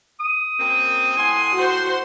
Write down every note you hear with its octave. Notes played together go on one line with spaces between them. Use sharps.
D#6
F#2 A#3 C4
A2 F#5 G#5 C6
F#4 C5